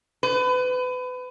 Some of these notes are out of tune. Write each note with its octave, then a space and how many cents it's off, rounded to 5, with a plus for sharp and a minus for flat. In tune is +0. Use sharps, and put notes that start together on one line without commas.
B4 +30